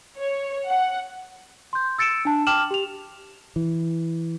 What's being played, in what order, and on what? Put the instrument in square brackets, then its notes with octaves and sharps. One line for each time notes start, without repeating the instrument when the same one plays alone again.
[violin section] C#5
F#5
[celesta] C6 G6
E6 A6 C#7 D7 E7
D4 A5
G5 A5 D6 F6 E7 F#7
G4 F7
[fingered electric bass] E3